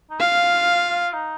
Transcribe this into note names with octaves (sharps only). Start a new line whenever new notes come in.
D#4
F4 F5
D#4